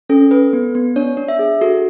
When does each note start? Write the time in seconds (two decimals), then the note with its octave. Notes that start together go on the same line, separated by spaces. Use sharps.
0.10 C#4 A4
0.31 A4 B4
0.53 B3
0.75 B3
0.96 D4 C#5
1.17 D4
1.28 E5
1.39 G#4
1.61 F#4 A4